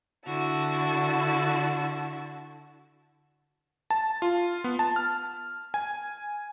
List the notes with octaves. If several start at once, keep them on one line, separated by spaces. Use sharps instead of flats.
D3 E4 F#4 A5
A5
F4
B3
A5
F6
G#5